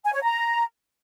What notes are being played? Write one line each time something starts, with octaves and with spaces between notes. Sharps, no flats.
G#5
C#5
A#5